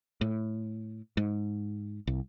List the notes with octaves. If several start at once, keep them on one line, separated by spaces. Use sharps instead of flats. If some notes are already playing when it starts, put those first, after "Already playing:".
A2
G#2
C2